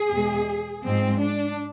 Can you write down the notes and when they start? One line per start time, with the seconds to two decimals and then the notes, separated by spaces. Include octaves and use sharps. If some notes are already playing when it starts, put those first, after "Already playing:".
Already playing: G#4
0.10 E2 B2 G#3
0.84 G#2 F3 G#3 C4
1.22 D4